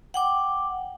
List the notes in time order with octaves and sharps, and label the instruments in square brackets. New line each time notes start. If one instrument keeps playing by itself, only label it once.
[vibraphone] F#5 G5 D6